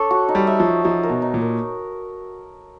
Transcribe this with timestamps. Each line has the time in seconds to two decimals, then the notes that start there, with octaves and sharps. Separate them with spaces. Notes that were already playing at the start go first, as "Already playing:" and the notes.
Already playing: D4 A4 C#5
0.11 F#4
0.28 D#4
0.35 G3
0.47 E5
0.60 F3
0.66 E5
0.84 F3 D#4
1.03 A#4
1.09 B2
1.22 D#4
1.34 A#2
1.41 A#4